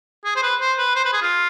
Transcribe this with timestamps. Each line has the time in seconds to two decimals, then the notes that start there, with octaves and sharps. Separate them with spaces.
0.25 G#4
0.36 C5
0.43 B4
0.60 C5
0.78 B4
0.96 C5
1.05 B4
1.13 G#4
1.22 F4